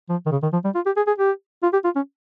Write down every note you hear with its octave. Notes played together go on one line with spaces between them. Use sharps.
F3
D#3
C#3
D#3
F3
G3
F4
G4
G#4
G#4
G4
F4
G4
F4
C#4